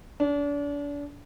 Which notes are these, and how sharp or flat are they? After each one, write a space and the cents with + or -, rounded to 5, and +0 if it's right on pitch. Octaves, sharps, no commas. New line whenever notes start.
D4 -35